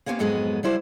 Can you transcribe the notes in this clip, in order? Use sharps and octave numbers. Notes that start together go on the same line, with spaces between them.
A#3 B3 C#4 E4 G4 C5
F2 G#2 F#3 G#3 B3
F#3 G3 E4 C5